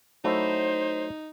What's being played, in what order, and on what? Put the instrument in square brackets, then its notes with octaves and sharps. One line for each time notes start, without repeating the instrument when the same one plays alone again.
[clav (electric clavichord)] F#3 A3 E4 [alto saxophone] D#4 [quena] C5